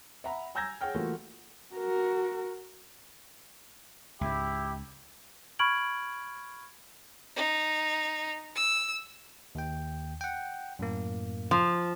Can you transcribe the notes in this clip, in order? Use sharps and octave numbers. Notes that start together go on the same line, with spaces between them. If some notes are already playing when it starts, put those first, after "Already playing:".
E5 F#5 A#5 B5
G#5 A#5 E6 G6 G#6 A#6
G#4 C#5 F#5 G5 F6
E3 A3 A#3 F4 F#4
F#4 A#4
C#2 G#2 E4 G4
B5 C#6 F6 G#6 D7 F#7
D#4
E6
D#2 G5
F#5 G5
F#2 A2 A#3
F3